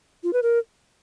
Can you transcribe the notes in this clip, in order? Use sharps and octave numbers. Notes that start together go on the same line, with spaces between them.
F4
B4
A#4